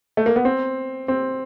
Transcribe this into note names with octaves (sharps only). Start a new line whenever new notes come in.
A3
A#3
B3
C4
C4